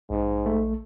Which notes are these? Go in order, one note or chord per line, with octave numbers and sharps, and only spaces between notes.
A#1 G#2
A3